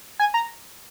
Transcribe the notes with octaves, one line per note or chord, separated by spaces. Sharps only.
G#5
A#5